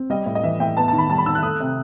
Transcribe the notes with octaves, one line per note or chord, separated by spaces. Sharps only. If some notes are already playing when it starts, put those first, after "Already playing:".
Already playing: C4
G3 D#5
A2
D#5
E3 E5
A2 G5
B3 A5
D#3 A5
B5
G3 A5
B5
D#3 E6
F#6
A3 D#6
C3